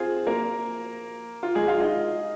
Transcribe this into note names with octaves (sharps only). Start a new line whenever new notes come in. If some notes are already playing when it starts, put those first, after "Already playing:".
Already playing: C4 F4 G#4 C5
A#3 A#4
F4
G#3 G#4
F4 F5
D#4 D#5